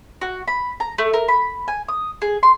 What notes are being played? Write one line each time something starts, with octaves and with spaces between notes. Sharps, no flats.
F#4
B5
A#5
A3
A#4
B5
G#5
D#6
G#4
C6